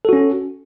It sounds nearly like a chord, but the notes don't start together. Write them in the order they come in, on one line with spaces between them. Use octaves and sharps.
A4 F#4 C#4